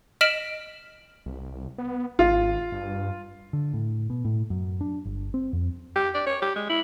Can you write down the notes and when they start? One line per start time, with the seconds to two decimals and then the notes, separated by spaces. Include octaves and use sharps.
0.21 D#5 F6 B6 D7 E7 F#7
1.26 C2
1.78 B3
2.19 G#1 F4
2.72 G2
3.53 D3
3.74 A2
4.10 B2
4.25 A2
4.50 F#2
4.81 D4
5.05 G1
5.34 C4
5.53 F2
5.96 G4
6.14 D5
6.27 C#5
6.42 G4
6.56 G#3
6.69 E4